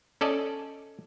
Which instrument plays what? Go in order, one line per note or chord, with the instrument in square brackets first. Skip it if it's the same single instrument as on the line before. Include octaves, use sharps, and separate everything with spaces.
[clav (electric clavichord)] C#4 A4 D5 D#5